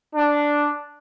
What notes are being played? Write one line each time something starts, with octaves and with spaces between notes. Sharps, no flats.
D4